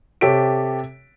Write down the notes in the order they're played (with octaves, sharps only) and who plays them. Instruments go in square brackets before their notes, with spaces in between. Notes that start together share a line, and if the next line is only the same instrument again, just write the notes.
[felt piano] C3 G4 A4 C#5 B6 D7